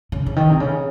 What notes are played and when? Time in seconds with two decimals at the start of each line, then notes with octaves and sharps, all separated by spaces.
0.12 C#3
0.26 C#3
0.36 D#3
0.50 C3
0.60 C#3